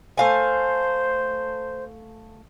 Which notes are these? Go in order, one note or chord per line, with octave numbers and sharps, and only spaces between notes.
A3 C5 F5 G#5